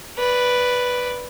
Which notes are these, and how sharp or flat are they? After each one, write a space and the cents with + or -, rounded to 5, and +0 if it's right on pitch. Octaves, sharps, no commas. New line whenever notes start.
B4 +0 D5 +0